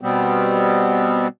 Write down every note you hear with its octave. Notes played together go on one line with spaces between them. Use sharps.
B2 G3 B3 C4